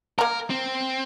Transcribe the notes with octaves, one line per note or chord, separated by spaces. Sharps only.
A#3 A#4 A#5
C4